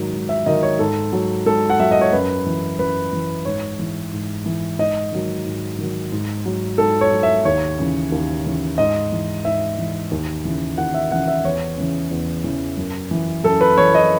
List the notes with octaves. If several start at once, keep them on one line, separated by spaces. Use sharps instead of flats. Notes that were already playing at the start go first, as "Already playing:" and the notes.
Already playing: G#2 D#3 F#3
G#2
E5
D#3 F#3 D#5
C#5
G#2 A4
F#3
G#2 A4
F#5
F#3 E5
D#5
C#5
F#2 B4
E3
F#2 B4
E3
G#2 C#5
E3
G#2
E3
G#2 D#5
D#3 F#3
G#2
D#3 F#3
G#2
F#3
G#2 A4
C#5
F#3
E5
D#2 C#5
C#3 E3
D#2
C#3 E3
G#2 D#5
E3
G#2 E5
E3
D#2
C#3 E3
D#2 F#5
E5
C#3 E3 F#5
E5
E2 C#5
C#3 E3
E2
C#3 E3
F#2
E3
F#2 A4
B4
E3 C#5
D#5